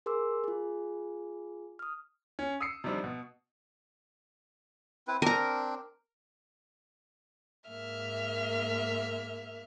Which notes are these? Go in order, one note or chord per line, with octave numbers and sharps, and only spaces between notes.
G#4 A#4 C6 D6 E6
F4 G#4
D#6 F6
C#4
D#6 E6 C7 C#7
C3 D#3 F3 G3 C4 D4
B2
C4 E4 B4
C4 D4 A#4 A#5
G#2 A#3 E5 F6